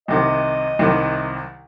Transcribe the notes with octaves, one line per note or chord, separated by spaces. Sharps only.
C2 C3 D#3 D#5
C2 C3 D#3